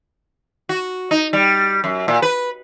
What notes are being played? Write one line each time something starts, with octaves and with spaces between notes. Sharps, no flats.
F#4
D#4
G3
F#2
A#2
B4